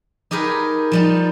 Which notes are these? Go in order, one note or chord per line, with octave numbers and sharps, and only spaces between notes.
D#4 G4 G#4 A#4 B4
F3 G3 D#4